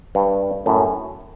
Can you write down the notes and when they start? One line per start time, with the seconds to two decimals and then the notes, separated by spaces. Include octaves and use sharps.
0.15 G2
0.66 F#2 A2